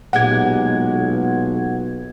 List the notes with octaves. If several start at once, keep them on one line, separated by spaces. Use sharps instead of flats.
B1 A#2 G#3 G4 F#5 G#6